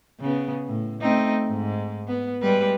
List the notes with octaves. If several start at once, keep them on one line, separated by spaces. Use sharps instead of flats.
C#3 B3
A2
A3 C4 D#4
G#2
B3
G3 G#3 B4